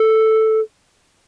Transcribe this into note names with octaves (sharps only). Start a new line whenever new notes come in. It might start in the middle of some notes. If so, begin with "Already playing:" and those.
Already playing: A4